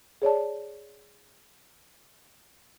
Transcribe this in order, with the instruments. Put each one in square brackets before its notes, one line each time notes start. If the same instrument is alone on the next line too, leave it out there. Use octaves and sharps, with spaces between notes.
[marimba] G#4 C#5 D5 A5